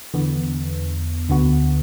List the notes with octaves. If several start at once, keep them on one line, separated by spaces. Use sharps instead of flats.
E2 D3 B3
D2 D3 B3 F#4